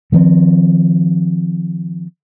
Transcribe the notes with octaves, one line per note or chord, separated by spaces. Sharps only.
D#3 F3 A3 C4